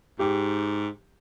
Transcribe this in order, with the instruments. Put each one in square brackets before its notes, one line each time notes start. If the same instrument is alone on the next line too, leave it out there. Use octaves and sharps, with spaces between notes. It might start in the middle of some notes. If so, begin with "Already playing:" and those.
[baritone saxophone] G#2 [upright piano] G4